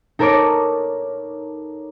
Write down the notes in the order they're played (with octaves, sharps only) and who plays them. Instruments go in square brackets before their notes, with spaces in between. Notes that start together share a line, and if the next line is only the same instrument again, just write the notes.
[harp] D#4 A4 A#4 C#5 D6